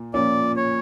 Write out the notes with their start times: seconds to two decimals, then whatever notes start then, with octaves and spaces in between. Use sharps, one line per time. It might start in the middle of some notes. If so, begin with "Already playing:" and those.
Already playing: A#2 A#3
0.14 A#2 F3 A#3 C#4 D5
0.56 C#5